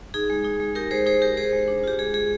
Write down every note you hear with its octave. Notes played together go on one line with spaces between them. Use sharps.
D#4 G#4
G#3
D#4
G#3
D#4 G4 A#4
G#3 G#4 C5
D#4 G#4 C5
G#3 G4 A#4
G#3 G#4 C5
G#3
D4
F4 G4
G#3 G#4
G#3 G#4